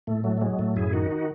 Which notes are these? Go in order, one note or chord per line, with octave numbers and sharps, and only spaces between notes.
A2 A3
F#3 A3
A3
F#3 G#3
A2 A3
F#2 E4 G#4
D#3 D#4 F#4
D#4 F#4